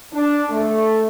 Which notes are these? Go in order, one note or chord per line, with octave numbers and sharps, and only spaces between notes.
D4
A3